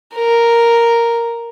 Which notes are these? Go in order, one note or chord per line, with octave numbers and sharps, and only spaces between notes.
A#4